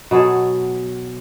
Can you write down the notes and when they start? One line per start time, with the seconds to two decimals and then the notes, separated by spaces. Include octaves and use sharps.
0.11 B2 F#3 G#4 A4